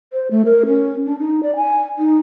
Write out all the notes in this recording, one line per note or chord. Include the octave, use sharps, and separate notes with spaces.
C5
A3
A#4
C#4
D4
D#4
D5
G#5
D#4